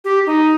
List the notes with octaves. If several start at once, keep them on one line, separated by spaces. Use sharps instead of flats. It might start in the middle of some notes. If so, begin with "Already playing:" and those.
G4
D#4